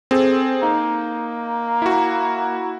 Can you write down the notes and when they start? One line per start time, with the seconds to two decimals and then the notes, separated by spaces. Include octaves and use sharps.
0.11 C4 G#4 A4
0.63 A#3 D#4
1.82 E4 F#4